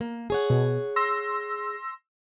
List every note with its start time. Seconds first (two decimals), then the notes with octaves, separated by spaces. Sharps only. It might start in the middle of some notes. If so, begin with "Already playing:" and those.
0.01 A#3
0.30 G#4 C#5 F#5
0.50 B2
0.96 C6 E6 A#6